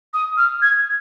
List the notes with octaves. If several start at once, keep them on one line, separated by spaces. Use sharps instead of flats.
D#6
F6
G#6